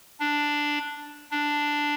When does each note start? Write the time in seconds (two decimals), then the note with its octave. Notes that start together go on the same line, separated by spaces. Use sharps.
0.20 D4
1.31 D4